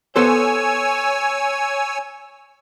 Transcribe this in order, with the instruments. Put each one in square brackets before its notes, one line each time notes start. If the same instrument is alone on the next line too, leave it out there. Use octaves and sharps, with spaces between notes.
[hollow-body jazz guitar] B3 A4 C5 [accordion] C#5 G#5 E6